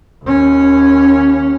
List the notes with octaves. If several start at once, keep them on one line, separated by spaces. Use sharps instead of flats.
D#2 C#4